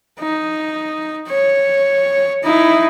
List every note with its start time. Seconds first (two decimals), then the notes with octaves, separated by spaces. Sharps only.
0.19 D#4
1.28 C#5
2.43 D#4 E4